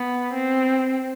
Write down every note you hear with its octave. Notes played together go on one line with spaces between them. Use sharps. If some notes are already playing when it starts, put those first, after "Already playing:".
Already playing: B3
C4